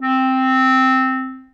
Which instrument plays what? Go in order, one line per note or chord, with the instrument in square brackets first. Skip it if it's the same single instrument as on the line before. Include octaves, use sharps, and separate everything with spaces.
[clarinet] C4